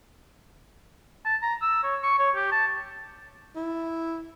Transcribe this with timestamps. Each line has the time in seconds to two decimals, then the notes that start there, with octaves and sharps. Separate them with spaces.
1.25 A5
1.42 A#5
1.61 E6
1.83 C#5
2.03 C#6
2.18 C#5
2.35 G4
2.51 A5
3.55 E4